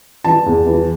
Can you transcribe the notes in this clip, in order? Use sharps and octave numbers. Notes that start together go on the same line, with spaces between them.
E3 A5
E2
E3